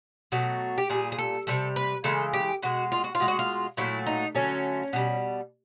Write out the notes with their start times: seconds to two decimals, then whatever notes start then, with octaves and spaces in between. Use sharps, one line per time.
0.32 B2 F#3 A3
0.78 G4
0.89 A#2 G3 G#4
1.12 G#4
1.18 A4
1.47 C3 E3 G3 A4
1.76 B4
2.04 C#3 E3 G#3 A4
2.33 G4
2.63 B2 G#3 F#4
2.92 F4
3.04 F#4
3.15 F4
3.20 B2 G#3
3.28 F#4
3.39 F4
3.77 A#2 F#3 A3 E4
4.06 D#4
4.35 D3 F#3 A3 C#4
4.93 B2 G3